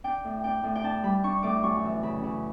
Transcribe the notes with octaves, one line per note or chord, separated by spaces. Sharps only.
D4 G5
A2
D4 G5
A2
G5
D4 A5
G3 B5
D4 C#6
A2 D6
F#2 C#6
E3
C#3 B5
C#3